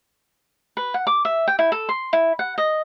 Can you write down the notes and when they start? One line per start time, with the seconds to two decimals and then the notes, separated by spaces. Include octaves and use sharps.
0.77 B4
0.94 F#5
1.07 D6
1.25 E5
1.48 G5
1.59 E4
1.72 A4
1.89 C6
2.13 E4
2.39 F#5
2.58 D#5